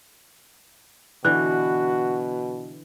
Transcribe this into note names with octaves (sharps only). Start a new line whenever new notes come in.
B2 D3 E3 F#4 F#6